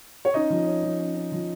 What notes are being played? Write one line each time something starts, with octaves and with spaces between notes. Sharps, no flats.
C#5
C#4 D#4 D#5
F3
C#4
F3
C#4
C#4
F3